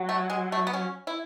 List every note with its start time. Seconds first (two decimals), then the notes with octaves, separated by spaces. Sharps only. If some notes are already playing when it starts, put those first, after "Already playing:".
Already playing: F#3
0.09 A3
0.30 G#3
0.52 A3
0.67 B3
0.73 C#4
1.07 E4